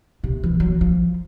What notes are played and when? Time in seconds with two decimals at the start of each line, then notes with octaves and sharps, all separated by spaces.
0.24 C3
0.44 E3
0.60 F#3
0.81 F3